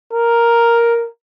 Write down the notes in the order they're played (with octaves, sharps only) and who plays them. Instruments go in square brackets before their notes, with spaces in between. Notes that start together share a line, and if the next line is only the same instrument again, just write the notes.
[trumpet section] A#4